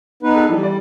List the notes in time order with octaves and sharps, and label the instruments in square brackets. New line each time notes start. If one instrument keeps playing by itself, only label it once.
[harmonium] B3 D#4 B4
[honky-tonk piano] G#4 A4
[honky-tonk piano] E3 [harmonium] G3
[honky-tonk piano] D5